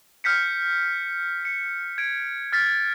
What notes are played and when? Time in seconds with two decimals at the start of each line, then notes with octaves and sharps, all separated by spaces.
0.24 F6 G6 B6 C#7
1.45 C#7
1.98 G#6 D7
2.52 F6 A6 B6